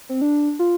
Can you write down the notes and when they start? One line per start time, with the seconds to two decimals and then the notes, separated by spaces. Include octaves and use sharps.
0.09 C4
0.21 D4
0.59 F4